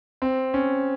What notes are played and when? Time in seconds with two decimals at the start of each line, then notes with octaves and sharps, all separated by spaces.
0.22 C4
0.54 C#4